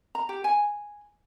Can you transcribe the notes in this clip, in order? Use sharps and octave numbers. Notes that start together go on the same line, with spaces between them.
A#5
G4
G#5